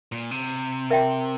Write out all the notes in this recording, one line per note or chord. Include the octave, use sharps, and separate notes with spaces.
A#2
C3
A#4 E5 G5